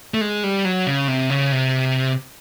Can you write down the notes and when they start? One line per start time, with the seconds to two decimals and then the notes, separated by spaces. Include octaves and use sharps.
0.14 A3
0.21 G#3
0.44 G3
0.65 F#3
0.87 C#3
1.08 C3
1.30 C#3
1.52 C3